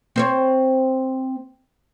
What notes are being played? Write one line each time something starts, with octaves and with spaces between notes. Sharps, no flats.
C4 C5 C#5